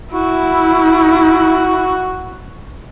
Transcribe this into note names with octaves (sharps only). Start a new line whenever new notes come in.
E4 F#4